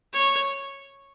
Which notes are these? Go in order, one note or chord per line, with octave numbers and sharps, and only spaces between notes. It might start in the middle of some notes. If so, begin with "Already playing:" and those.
C#5